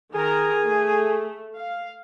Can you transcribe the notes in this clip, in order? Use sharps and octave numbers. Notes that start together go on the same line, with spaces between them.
D#3 G#4 A#4 A#5
A3
F5